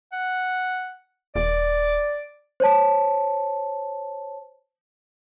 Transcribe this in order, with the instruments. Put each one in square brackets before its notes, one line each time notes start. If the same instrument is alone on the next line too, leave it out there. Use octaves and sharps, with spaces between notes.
[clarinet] F#5
[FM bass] D#1 [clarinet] D5
[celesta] C5 C#5 A5